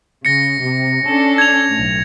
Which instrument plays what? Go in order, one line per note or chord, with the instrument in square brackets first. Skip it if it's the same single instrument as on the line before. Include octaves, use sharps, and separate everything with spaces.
[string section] C#3 [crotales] A#6 C#7
[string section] C3
C#4 D4 A4
[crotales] G#6 F7
[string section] B1 A2